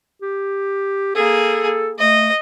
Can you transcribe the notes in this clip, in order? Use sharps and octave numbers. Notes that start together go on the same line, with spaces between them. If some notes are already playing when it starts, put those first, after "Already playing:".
G4
A#3 G#4 A4
A3 D#5